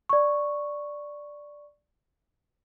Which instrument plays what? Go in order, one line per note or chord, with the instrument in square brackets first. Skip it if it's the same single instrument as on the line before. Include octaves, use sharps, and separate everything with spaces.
[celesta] D5 C#6